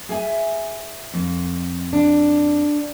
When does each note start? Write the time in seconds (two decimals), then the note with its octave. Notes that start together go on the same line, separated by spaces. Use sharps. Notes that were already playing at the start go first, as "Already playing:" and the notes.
0.09 G#4 E5 G#5
1.14 F2
1.93 D4